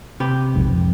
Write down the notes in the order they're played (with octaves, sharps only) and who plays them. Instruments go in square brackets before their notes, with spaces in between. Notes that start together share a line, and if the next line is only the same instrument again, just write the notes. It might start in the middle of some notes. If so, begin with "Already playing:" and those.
[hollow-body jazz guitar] C3 G4 B4
[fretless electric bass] B1 F2 G#2
F2